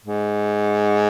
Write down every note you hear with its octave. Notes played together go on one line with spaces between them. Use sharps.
G#2